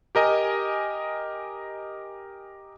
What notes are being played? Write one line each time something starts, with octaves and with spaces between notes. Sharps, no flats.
G4 A#4 D#5 G#5